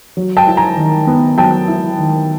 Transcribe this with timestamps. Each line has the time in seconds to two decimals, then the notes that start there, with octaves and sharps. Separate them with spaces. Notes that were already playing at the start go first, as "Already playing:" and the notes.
0.17 F#3
0.37 G5 A5
0.47 E4
0.57 G#5 A#5
0.77 D#3
1.07 B3
1.37 F#3 G5 A5
1.67 E4
1.99 D#3